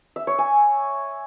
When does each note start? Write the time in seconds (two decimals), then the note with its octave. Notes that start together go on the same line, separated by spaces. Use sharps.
0.16 E5
0.27 C#5
0.38 G#5